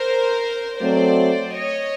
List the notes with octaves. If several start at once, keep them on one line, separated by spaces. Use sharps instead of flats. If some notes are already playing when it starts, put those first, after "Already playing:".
Already playing: A#4 C5
F#3 A3 C4 C5 D5
C#5 D#5